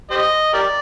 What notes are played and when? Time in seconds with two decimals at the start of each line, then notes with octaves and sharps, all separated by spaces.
0.11 G4 C5 D#5
0.53 G4 A#4 D5